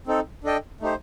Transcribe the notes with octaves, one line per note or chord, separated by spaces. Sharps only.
C4 D#4 A4
D4 A4 D#5 G5
A3 D#4 G4 C5